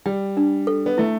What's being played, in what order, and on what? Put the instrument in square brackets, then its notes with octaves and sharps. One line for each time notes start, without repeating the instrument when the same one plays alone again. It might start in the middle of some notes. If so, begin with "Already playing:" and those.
[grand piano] G3 [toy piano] G5
[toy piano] D4
A4
[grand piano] B3
[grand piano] A3 [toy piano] E4